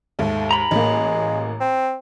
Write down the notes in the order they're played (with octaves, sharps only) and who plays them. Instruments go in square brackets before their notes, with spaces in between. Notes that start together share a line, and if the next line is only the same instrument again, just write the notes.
[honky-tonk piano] D#2 G#2 [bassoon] A3
[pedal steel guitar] A#5 B5
[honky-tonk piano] A1 A#3 [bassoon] G#3
[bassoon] C4